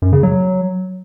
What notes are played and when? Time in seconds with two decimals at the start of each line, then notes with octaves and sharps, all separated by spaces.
0.02 F#2
0.13 C#3
0.23 F#3